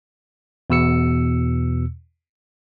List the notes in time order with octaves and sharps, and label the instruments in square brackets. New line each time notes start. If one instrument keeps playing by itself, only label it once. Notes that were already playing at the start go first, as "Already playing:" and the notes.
[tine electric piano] E2 B2 E6 C#7